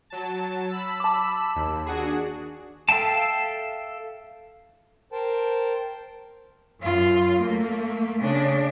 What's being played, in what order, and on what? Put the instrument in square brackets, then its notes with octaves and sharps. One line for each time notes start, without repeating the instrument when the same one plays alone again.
[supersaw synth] F#3 A5
B5 E6
[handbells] A5 D6
[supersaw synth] D#2
D4 F#4 G#4
[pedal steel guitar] A4 E5 F5 G5 A5
[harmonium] A#4 C5 G5 A5
[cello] F#2 F4
A3 A#3
C#3 D4